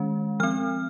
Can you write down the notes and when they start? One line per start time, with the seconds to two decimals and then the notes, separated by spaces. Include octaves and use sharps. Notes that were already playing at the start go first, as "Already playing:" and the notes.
Already playing: D#3 G#3 C#4
0.40 F3 C4 F6